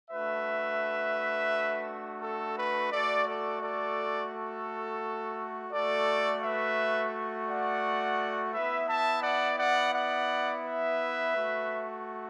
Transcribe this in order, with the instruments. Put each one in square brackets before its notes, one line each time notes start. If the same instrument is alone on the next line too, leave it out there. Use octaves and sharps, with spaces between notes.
[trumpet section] A3 D4 F#4 B4 E5
A4
B4
A3 F#4 A4 D5
A4 D5
A4 D5
A4
A3 F#4 A4 D5
B4 E5
D5 F#5
B3 E4 B4 E5
E5 A5
D5 F#5
D5 F#5
D5 F#5
B4 E5
A3 F#4